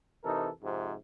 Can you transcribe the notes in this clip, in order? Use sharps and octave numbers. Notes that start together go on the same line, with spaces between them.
C3 E3 D#4 A4 A#4
F2 G#2 C3